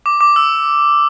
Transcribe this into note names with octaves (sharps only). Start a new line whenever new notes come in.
D6
D6
E6